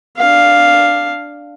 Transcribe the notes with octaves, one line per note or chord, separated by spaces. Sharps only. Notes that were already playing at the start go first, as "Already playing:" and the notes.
D4 F5